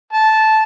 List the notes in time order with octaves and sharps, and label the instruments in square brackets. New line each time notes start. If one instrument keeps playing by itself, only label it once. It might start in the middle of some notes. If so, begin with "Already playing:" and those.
[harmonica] A5